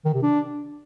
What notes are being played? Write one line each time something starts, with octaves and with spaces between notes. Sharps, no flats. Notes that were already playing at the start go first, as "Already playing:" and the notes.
D#3
C3
D4